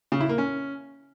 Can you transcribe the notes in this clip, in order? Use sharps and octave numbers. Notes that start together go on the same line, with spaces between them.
C#3
E4
A#3
C#4